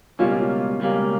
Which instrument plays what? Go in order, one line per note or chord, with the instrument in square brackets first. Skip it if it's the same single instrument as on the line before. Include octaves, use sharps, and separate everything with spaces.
[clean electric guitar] C#2 B2 G3 A#3 C#4 [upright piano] F4
[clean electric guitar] C#2 B2 G3 A#3 C#4